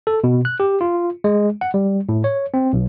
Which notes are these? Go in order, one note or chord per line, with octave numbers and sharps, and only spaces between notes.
A4
B2
F#6
G4
F4
G#3
F#5
G3
A2
C#5
C4
B1